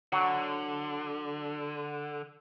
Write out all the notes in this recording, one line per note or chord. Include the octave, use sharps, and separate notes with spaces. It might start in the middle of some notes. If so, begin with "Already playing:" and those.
D3 F#3